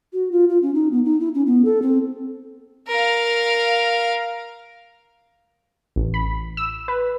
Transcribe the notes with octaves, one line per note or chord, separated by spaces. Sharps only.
F#4
F4
F4
C#4
D#4
B3
D#4
E4
C#4
B3
A4
C4
A#4 F5
A1
B5
E6
B4